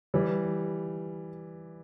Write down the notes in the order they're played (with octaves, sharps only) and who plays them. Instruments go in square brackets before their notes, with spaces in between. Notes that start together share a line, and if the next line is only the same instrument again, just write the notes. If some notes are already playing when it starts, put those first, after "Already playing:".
[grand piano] E3 G3